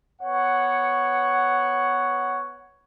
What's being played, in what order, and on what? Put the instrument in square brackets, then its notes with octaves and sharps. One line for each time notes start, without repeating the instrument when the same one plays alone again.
[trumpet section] B3 C#5 F#5